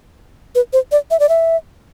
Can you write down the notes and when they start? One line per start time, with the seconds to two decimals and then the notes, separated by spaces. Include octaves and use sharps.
0.55 B4
0.73 C5
0.92 D5
1.11 E5
1.20 D5
1.29 E5